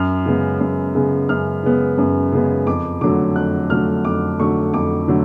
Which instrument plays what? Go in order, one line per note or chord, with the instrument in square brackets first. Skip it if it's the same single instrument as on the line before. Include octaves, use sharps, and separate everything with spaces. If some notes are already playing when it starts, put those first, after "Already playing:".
Already playing: [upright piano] F#2 F6
C#3 G#3 B3
F#2
C#3 G#3 B3
F#2 F6
C#3 G#3 B3
F#2
C#3 G#3 B3
F2 D6
D3 F#3 A3 D6
F2 F#6
D3 F#3 A3 F6
F2 D6
D3 F#3 A3 C#6
F2 D6
D3 F#3 A3